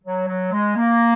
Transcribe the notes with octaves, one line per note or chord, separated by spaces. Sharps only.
F#3
F#3
G#3
A#3